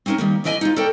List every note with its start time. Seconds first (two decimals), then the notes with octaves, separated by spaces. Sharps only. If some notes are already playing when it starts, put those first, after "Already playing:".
0.06 C4 C#4 D#4 A#4 C#5
0.18 D#3 G3 A#3
0.44 D2 C#3 E3 D5 D#5 G#5
0.61 D#4 F4
0.76 A4 A#4 C#5 D5 G5